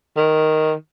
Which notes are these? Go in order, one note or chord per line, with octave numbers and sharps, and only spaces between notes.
D#3